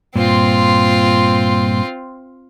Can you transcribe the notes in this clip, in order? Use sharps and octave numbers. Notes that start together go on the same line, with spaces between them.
G2 A#2 C4 F4